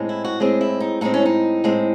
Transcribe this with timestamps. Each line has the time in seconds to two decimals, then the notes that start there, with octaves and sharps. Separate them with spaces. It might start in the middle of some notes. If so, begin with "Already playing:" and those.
Already playing: A2 G#3 C4
0.09 E4
0.25 F#4
0.40 A2 G#3 C4 G#4
0.61 E4
0.80 D#4
1.01 A2 G#3 C4 D#4
1.14 C#4
1.25 D#4
1.64 A2 G#3 C4